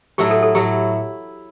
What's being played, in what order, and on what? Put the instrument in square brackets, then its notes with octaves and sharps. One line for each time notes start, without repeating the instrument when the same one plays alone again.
[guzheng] A2 F#3 A3 E4 [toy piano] G4
[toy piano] A4
A4
[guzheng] A2 F#3 A3 E4 [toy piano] G4